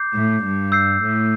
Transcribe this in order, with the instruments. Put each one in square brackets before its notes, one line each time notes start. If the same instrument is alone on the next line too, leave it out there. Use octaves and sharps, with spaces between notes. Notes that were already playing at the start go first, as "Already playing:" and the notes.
Already playing: [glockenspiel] D6 G6 C7
[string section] A2
G2
[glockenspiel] E6 G6 C7
[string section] A2